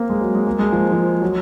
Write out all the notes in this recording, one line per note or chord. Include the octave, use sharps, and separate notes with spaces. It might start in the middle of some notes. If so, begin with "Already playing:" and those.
Already playing: A#3 C4
G#3
F#3
G#3
A#3
G#3
F3
F3
F#3